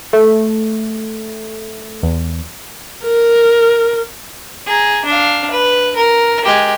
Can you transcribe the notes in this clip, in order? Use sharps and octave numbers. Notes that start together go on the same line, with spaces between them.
A3
E2
A#4
G#4 A#5
D4 F5
B4
A#4
G#3 G4